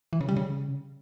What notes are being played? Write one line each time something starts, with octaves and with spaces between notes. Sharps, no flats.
E3
C#3
G3
C#3